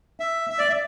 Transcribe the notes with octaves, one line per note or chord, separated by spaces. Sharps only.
E5
E5
D5
E5